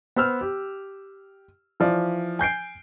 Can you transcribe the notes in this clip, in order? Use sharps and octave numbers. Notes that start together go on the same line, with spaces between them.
B3 C5 E6 F6
G4
E3 F3 D5
G#5 G6 C7 D7